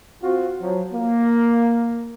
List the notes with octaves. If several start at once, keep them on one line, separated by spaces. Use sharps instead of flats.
C4 F4 F#4
F3 F#3
A#3